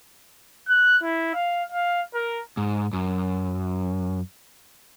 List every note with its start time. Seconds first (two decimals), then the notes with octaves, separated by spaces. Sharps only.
0.68 F#6
1.03 E4
1.34 F5
1.72 F5
2.14 A#4
2.57 G#2
2.93 F#2